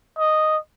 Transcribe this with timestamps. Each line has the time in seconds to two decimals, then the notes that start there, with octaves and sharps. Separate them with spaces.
0.18 D#5